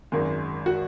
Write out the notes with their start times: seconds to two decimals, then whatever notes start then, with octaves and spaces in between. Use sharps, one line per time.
0.12 G#1 F#2 D#3 G#3
0.66 F#4